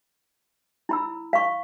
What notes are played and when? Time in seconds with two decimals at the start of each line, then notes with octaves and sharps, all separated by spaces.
0.89 E4 B5 E6
1.33 F5 C#6